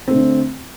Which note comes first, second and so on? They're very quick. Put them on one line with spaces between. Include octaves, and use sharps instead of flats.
C4 A3 D3